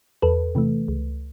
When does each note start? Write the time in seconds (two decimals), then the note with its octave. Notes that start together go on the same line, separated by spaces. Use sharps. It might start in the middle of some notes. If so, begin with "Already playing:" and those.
0.22 E2 A4 B4
0.55 C3 E3 A3
0.88 C#2